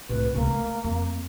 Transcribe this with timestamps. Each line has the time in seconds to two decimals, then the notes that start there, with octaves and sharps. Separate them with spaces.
0.09 C2 A2 B4
0.35 C#2 C3 A#3
0.51 A3
0.84 F2